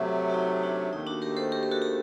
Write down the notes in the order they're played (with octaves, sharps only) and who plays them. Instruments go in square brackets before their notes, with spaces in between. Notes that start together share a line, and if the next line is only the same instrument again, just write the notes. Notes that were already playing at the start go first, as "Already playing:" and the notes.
Already playing: [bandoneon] C3 F#3 A3
[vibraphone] F#4
D#4
D#4
D4 F#4
[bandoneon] D#2 D#3 A3 [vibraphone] D#4
[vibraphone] D4 F#4
G4 A#4
A4 C5
G4 A#4
A#4
F#4 A4
G4